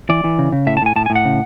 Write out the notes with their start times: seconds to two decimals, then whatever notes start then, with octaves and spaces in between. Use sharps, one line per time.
0.10 E3 D5
0.24 E3
0.39 C#3
0.52 C#3
0.67 A2 E5
0.77 A5
0.82 A2 G#5
0.96 A2 A5
1.06 G#5
1.10 A2
1.15 F#5
1.25 C#3